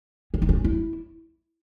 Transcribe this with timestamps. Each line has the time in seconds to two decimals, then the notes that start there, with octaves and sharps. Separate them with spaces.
0.34 C#4
0.42 D#4
0.49 C#4
0.64 E4